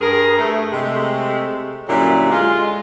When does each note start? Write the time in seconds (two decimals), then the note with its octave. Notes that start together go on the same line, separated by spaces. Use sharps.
0.01 G2 G#4 A#4
0.38 A3
0.72 C3 G#3 A3
1.88 F#2 A#2 D3 F#3 G3 E4
2.31 G#3 F4